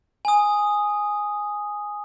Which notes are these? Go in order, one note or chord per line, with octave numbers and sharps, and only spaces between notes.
G#5 D#6